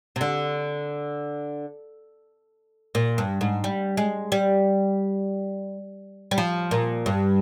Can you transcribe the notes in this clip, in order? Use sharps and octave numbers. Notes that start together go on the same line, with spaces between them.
C3
D3
A#2
G2
G#2
G3
G#3
G3
G3
F3
A#2
G2